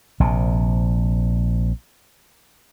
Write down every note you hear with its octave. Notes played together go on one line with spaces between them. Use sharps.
A#1 C3